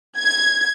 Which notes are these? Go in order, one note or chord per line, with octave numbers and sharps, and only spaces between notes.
G#6